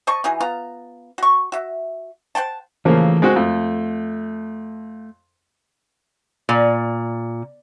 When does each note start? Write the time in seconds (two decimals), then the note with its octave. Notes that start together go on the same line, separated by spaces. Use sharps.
0.07 C5 D#5 A5 C#6
0.24 E3 D#4 F#4 G#4
0.40 B3 F4 A#5
1.18 F#4 C#6
1.52 F#4 E5
2.35 C5 F#5 G5 A5
2.85 C#3 E3 F3 A3 A#3 A4
3.22 G#3 C4 F#4
3.36 F2 A3
6.49 A#2